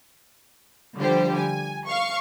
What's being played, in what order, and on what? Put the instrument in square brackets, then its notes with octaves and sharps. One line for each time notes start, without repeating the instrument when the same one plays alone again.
[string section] D3 F3 G3 G4 C5
G#5
F5 C#6